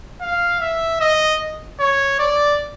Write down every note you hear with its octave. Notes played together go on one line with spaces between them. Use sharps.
F5
E5
D#5
C#5
D5